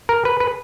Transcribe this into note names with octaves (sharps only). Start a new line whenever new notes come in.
A#4
B4
B4